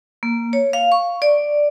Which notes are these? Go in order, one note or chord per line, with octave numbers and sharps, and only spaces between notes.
A#3
C#5
F5
C#6
D5